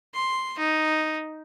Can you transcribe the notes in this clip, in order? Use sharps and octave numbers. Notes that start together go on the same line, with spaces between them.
C6
D#4